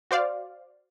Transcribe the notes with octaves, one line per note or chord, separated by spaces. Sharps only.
F#4 C5 D5 F5